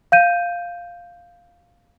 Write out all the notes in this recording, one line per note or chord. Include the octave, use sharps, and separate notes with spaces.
F5 G6 D#7